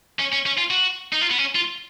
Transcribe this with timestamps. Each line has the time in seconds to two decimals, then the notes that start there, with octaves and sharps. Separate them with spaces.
0.20 C#4
0.33 C#4
0.46 C#4
0.58 F4
0.70 F#4
1.13 D#4
1.21 F4
1.31 B3
1.38 C#4
1.55 F4